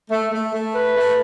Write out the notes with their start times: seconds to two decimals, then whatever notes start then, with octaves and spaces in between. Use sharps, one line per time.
0.10 A3
0.32 A3
0.53 A3
0.75 B4
0.96 A3